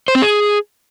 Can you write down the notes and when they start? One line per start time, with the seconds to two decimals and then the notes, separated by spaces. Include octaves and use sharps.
0.08 C5
0.15 C4
0.22 G#4